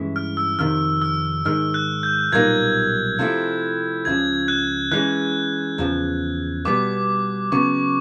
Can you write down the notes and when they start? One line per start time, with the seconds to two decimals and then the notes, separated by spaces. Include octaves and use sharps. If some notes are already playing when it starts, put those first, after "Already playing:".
Already playing: G2 E3 G#3 C#4 E4
0.16 F6
0.37 E6
0.59 F2 C3 D#3 F6
1.02 E6
1.45 G#2 D#3 G#3 F6
1.74 F#6
2.03 G6
2.32 B1 A#2 G3 A#3 D#4 G#6
3.19 C3 F3 A3 C4 E4
4.05 C#2 C#3 F3 G#6
4.48 F#6
4.92 E3 G#3 C#4 F#6
5.78 E2 C#3 F3
6.65 B2 G3 B3 D6
7.52 C#3 F#3 B3 C#6